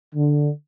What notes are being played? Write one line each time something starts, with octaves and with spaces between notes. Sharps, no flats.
D3